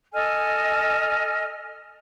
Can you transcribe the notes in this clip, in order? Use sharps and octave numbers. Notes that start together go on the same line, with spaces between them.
A4 D#5 G#5 F6